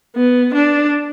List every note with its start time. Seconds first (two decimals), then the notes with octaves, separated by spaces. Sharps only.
0.16 B3
0.54 D4